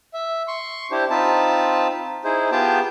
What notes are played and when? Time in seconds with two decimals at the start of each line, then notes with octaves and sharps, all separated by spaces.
0.14 E5
0.48 C6 C#6
0.91 D4 E4 G4 C5
1.10 C4 D#4 F4 A5 B5
2.24 D#4 E4 G#4 C5
2.52 B3 F4 G4 G#4 G5 A5